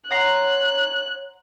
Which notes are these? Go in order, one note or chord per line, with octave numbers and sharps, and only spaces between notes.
C#5 F#5 A#5 C6 F#6